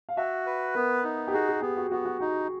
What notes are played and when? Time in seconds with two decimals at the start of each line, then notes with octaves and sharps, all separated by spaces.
0.09 F5
0.17 F#4 E5
0.46 B4
0.75 B3 A#4
1.04 D#4
1.28 G4
1.33 F#4 G#4
1.48 G#4
1.62 B3 G4
1.77 F#4
1.91 B3 F#4
2.05 F#4
2.20 D#4 F#4